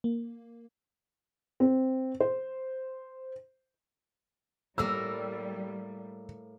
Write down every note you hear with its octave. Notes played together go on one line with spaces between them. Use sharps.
A#3
C4
C5
A2 G3 A#3 A#4 E6